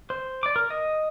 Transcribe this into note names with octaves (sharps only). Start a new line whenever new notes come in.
C5
D5 D6
A#4
D#5